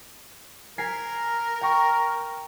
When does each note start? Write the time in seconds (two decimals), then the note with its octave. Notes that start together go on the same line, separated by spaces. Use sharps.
0.78 A#4 G#5 B6 C7
1.61 G5 A#5 C#6